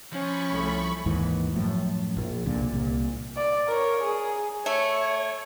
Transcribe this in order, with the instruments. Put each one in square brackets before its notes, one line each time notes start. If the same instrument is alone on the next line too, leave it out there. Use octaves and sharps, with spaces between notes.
[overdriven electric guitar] F3 [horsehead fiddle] C#4 [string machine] B5 C#6
[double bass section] C2 A3
[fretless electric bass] D#2 G#2 E3
F#2 A2 F3
A#1
C2 A#2 D3
C2 A#2
[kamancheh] D5
A#4 C#5
G#4
[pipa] A3 [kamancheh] C#5